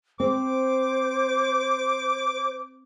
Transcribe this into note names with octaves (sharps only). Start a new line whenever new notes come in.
C4 C5 D6